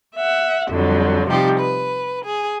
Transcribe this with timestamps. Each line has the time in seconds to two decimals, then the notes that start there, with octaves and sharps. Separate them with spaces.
0.16 E5 F#5
0.70 F2 D3 F#3 G3
1.30 C3 F3 G3 D#4 G4
1.59 B4
2.24 G#4